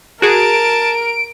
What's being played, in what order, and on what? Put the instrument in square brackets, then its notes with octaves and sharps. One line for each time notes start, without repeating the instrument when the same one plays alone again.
[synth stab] F#4 G#4 [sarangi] A#4 [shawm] A5 [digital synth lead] D7